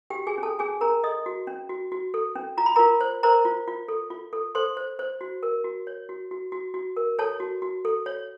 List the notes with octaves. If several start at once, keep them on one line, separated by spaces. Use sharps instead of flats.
F#4 G4 G5
G#4 G#5
C#4
A4 A5
C#4 G#4 G#5
C#4 A#4 A#5
A4 D#5 D#6
F#4
C#4
F#4
F#4
A4
C#4
F4 A#5
B5
F4 A#4 A#5
C5
A#4 C5 A#5
F4
F4
A4
F4
A4
A4 C5 C6
C5
C5
F#4
A#4
F#4
C#5
F#4
F#4
F#4
F#4
A#4
A4 C#5 A5
F#4
F#4
A4
C#5